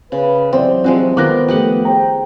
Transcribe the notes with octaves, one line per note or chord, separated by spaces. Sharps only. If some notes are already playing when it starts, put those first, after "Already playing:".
C#3 B4
C3 E3 F#3 C4 D5 E5
F3 G#3 C4 F#4
D#3 B3 F4 A#4 D6 F#6 A#6
F3 A3 G4 D#5 F#5
G#4 C5 G5 A#5